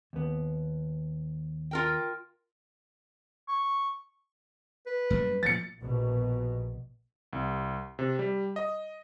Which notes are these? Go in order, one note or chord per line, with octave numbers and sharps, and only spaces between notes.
D#2 B3
F4 A#4 G5
C#6
B4
F#2 G3 A#3
A#2 F3 A6 C#7
A#1 B2
C2
C3
G3
D#5